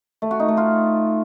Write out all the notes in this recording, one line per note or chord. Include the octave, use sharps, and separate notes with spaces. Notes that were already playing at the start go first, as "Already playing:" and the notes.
A3
F#4
D#4
A3
F4